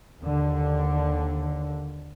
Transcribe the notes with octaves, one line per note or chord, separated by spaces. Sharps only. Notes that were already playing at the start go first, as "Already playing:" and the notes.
D#2 D3